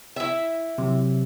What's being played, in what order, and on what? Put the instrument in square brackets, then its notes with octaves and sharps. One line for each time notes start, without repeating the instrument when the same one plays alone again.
[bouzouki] E4 E5
[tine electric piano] C3 F#3